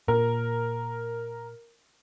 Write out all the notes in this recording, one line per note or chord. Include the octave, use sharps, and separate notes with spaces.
A#2 A#4